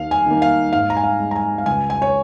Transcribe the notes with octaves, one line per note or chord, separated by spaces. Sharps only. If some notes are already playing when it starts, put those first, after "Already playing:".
Already playing: D#2 F5
G#5
D#3 A#3
F5
G#2 F5
A#5
G#5
F5
G#3
A#5
G#5
F5
C#2 G#5
G#5
C#5